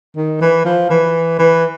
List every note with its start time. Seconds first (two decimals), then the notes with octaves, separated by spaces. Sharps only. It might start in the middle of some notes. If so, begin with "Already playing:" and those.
0.17 D#3
0.41 E3
0.65 F3
0.90 E3
1.39 E3